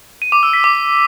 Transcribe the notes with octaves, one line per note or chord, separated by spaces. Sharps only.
D#7
D6
E6
B6
D6